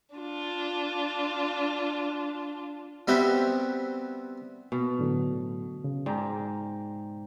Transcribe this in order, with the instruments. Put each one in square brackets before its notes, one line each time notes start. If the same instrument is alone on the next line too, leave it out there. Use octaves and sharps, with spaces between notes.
[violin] D4 F4
[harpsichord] G3 B3 C4 F#4 G4 E5
[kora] B2
[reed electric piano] A2 D3 F#3
C#3
[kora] G#2 [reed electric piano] D5 G5 A#5